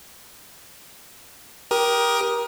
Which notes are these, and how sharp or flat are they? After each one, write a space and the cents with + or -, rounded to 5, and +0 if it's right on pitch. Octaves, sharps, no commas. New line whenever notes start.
G4 +0 A#4 +25 D#6 +0